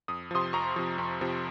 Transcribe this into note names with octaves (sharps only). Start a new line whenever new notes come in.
F2 D#6
C3 F3 C6 D#6
F2 A#5 C#6
C3 F3
F2
C3 F3